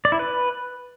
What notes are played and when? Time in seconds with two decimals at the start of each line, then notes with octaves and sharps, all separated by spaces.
0.05 D5
0.12 E4
0.19 B4